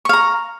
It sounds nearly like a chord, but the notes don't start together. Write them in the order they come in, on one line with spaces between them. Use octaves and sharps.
C#6 F5 A#5